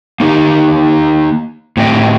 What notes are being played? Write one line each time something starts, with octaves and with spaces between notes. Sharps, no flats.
A#3 D#4 G4
A2 C4 G4 D#5 G5